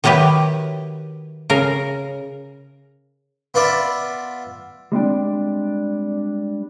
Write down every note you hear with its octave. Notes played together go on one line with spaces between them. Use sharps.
D#3 F#3 E4 G4 B4
C#3 A#4
B3 F4 B4 D5 E5
G3 G#3 C4 D4